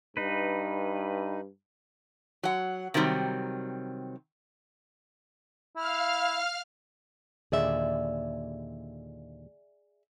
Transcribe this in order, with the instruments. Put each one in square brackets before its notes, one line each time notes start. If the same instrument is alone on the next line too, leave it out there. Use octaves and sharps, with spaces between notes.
[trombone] G2 [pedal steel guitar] D#4 B4
[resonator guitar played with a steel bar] F#3 F#5
C3 D#3 F#3 G3 C4
[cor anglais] E4 [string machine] F5 F6
[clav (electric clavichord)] D#2 A#2 D3 [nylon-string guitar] G#4 D5 E5